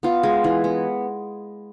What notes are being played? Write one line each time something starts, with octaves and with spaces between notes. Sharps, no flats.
B3 F4
G#3
E3
B3